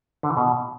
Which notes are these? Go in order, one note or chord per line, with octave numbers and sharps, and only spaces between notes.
D3
E3
B2